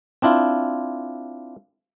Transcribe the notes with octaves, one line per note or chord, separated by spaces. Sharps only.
C4 D4 E4 F4